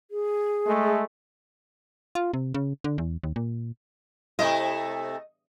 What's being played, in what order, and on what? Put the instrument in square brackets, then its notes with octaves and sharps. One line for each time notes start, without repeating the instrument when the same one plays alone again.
[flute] G#4
[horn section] G#3 A3
[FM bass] F4
C3
C#3
D3
E2
D#2
A#2
[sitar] C3 A3 E4 [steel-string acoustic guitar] D#5